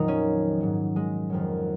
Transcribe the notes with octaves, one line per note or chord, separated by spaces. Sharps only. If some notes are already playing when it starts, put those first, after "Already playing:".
Already playing: F2 A#2 D#3 F#3 D#4
C#4
G#2 F#3
G#3
F2 D#3 F#3